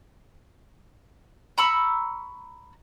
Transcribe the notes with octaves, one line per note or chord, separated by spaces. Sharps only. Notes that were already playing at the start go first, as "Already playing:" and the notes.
A#5 B5 C#6 E6